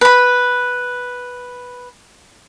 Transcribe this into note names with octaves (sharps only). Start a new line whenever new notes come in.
B4 B5